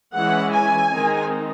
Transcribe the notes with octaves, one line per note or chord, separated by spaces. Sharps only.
E3 G#3 C#4 E4 F#5
G#5
D#3 G#3 C4 D#4